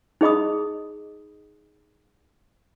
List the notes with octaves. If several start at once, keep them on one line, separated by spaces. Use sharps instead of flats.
D#4 G#4 D#5 B5 D#6